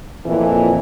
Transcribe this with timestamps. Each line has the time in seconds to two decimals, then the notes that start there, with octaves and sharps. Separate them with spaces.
0.24 F2 A#2 E3